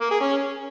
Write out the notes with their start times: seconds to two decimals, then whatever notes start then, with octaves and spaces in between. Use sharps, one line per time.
0.01 A#3
0.11 G#4
0.21 C#4